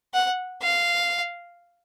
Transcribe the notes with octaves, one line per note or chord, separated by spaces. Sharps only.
F#5
F5